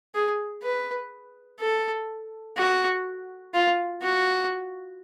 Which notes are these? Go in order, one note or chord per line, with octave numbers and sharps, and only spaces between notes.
G#4
B4
A4
F#4
F4
F#4